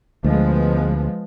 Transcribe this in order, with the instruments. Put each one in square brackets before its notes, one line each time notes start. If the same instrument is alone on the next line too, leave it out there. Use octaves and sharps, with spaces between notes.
[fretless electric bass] D2 [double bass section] F3 G#3 B3